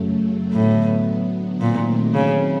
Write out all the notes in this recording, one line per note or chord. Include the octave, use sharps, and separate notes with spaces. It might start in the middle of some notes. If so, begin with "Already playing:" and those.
Already playing: F#2 C#3 F#3 A3
A2 D3 F#3 B3
A#2 D#3 F#3 A3 C4
C#3